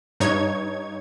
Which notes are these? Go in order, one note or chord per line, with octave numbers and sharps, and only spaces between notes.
G2 D#4 C#5 G#6